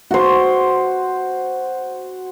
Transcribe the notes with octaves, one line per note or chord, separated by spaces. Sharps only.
F#4 C5